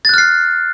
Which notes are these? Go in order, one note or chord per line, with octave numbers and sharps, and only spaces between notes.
F6 F#6 A6 C7